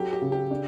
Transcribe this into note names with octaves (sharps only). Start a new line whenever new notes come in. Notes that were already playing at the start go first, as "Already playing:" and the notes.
Already playing: F#3 G4 A4
G4
C#3
G4
D4